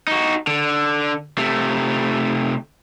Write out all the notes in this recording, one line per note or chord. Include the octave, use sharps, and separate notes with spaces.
D#4 F#4
D3
C3 A3